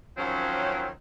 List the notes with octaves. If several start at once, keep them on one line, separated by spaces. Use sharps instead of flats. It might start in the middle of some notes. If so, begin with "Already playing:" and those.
D#3 F3 F#3 C4 C#4